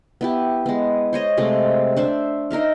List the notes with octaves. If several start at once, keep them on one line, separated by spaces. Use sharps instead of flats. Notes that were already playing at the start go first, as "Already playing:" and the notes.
B3 E4 G4
G#3 B3
C5 C#5 D#5
C3 G#3 A3
D4 C5 E5
D#4 A#4 E5 F5